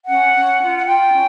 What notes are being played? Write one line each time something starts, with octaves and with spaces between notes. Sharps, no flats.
C#4 F#5
C#4
F4
F#5
F4 G5
C#4